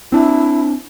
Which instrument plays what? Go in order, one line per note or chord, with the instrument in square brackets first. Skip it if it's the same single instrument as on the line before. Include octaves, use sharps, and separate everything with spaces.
[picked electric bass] C4 D4 [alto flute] E4